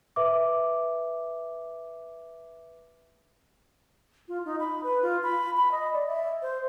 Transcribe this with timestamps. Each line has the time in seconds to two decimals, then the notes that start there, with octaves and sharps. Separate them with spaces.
0.16 B4 E5 D6
4.28 F4
4.45 D#4
4.60 B5
4.83 B4
5.02 F4
5.23 B5
5.57 B5
5.72 D#5
5.93 D5
6.07 E5
6.42 C5